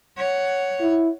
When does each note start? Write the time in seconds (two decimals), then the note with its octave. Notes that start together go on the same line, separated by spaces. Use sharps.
0.17 C#5 F#5
0.81 E4